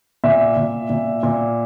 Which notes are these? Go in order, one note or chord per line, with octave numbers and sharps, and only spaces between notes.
A#2 E5
A#2
A#2
A#2